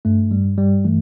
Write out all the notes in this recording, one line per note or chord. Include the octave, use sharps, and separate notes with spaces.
G2 A3
G3
G2
G3
E3 A3